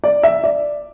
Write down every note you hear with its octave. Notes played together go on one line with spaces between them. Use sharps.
D5
E5
D5